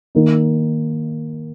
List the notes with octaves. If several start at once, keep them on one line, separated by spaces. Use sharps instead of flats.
D#3 A#3 D#4